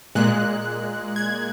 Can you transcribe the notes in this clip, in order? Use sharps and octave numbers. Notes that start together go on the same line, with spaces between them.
A#2 G#3 F#6
G#6